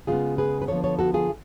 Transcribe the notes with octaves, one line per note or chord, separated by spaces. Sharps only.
C#3 G#3 B3 F4 G#4
G#4 B4
B4
D3 F3 B3 A4 C#5
A4 C#5
F#4 A4
F4 G#4